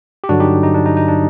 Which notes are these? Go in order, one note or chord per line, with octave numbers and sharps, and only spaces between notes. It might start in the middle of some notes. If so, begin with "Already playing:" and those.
G4
G2 D3 F#3 D4 F#4
D#4 G4
D#4
D4
D#4
D#4
D4